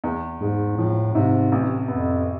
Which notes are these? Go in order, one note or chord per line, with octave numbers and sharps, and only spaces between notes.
E2
G#2 G#3
A2 F3
G#2 C3
A1
F2 B3